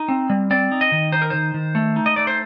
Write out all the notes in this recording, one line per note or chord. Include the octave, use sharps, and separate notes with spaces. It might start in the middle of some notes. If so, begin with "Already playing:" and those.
Already playing: D#4
C4
G3
C4 D5
D#4
D#5
D#3
D#4 C5
A#4
D#3 C5
D#3
A3
D#4
D#5
A3 D5
C5